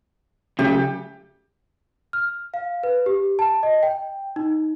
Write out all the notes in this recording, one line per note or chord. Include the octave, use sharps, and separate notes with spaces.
C#3 F#3 A3 G4
F6
F5
B4
G4
A5
D#5
G5
D#4